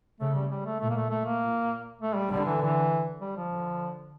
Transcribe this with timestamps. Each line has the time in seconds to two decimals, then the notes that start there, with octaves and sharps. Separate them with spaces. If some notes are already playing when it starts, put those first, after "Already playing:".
0.20 C#3 A3
0.35 G3
0.51 G3
0.65 A3
0.80 A#2 A3
0.90 A#3
0.96 A3
1.10 A3
1.26 A#3
1.40 A#2
2.02 A3
2.16 G3
2.31 D3 G3
2.46 E3
2.61 E3
3.21 G3
3.37 F3
3.52 D3